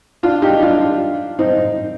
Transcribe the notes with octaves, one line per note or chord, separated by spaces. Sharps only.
D4 F4
D#4 G4
D4 F4
C4 D#4